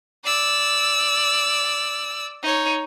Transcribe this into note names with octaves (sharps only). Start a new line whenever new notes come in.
D5 E6
D#4 C#5